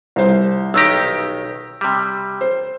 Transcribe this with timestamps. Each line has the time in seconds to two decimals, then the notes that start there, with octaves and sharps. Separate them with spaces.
0.16 C2 C5
0.74 B1 D#3 G4 E6 A#6
1.81 C3 G3
2.41 C5